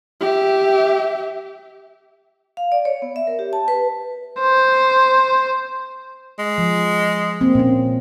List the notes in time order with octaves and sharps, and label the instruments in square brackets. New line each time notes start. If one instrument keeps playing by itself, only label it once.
[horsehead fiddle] G4 E5
[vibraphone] F5
D5
C#5
B3
E5
A#4
G4
A5
B4
[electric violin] C5
[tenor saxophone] G#3
[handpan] F3
A#3 C4
A#2 C#4